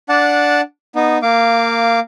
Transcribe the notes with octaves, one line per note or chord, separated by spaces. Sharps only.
D4 D5 F#5 A5
B3 D#4
A#3 F5 D6